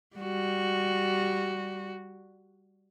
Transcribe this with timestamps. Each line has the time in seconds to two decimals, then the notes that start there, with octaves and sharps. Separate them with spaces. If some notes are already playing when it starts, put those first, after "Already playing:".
0.17 G3 F#4